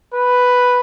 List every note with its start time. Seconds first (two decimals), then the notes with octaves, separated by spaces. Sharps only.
0.14 B4